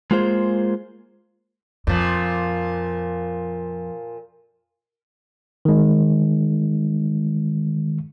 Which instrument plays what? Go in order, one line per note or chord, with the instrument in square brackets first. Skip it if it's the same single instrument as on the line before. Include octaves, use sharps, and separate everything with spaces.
[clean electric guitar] G#3 A#3 F4 G#4 C5
[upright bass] F2 [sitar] A#2 F3
[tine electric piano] D#3 G#3